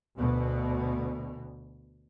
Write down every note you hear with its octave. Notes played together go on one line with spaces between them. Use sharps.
D2 B2